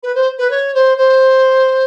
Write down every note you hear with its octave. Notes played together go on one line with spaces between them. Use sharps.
B4
C5
B4
C#5
C5
C5